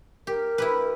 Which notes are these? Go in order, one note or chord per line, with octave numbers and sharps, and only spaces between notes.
G4 A#4
E4 G4 B4